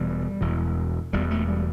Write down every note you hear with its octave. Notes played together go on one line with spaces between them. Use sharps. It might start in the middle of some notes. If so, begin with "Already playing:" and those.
Already playing: E1 E2 B2 G3
E1 E2 B2
E1 E2 B2 G3
A3
G3